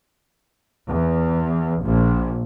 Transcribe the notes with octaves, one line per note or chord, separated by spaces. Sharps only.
E2
A#1